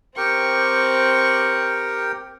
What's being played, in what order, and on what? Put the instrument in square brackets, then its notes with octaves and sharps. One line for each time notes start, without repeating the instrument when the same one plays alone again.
[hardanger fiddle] C4 C#6 [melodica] G4 A#4 G5